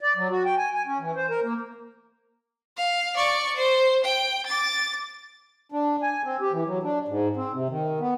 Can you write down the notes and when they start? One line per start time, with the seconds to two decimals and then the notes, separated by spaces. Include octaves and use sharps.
0.01 D5
0.16 F#3
0.30 F#4
0.45 G5
0.58 G#5
0.74 G#5
0.86 C#4
0.99 E3
1.16 C5
1.30 A#4
1.43 A#3
2.77 F5
3.17 D5 C#6
3.56 C5
4.04 G5
4.46 D6 A6
5.72 D4
6.02 G#5
6.24 C4
6.41 G4
6.53 E3
6.67 F#3
6.83 D4
7.08 G#2
7.36 C4
7.53 C3
7.70 D#3
8.00 B3